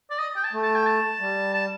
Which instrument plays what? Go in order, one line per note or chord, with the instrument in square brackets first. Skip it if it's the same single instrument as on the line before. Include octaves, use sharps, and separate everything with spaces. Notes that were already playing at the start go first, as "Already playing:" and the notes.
[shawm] D5
D#5
G5
A5
[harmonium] A3
[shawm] A5
G5
A5
[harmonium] G3
[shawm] A5